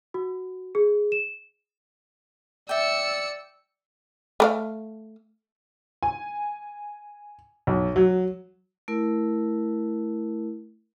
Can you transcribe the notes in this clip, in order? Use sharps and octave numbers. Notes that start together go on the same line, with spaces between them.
F#4
G#4
E7
D5 E5 G5 E6 C#7
A3 A#4 F5
G#5
B1
F#3
A3 E4 A#4